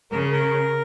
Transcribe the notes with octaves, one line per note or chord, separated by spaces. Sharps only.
C#3 A#4
A#4